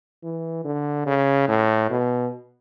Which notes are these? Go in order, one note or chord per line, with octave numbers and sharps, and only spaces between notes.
E3
D3
C#3
A2
B2